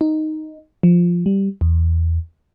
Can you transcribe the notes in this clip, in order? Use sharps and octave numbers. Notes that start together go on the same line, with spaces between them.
D#4
F3
G3
E2